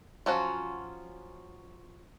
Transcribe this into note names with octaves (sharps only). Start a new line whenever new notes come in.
F3 F#3 C#4 F4 F#4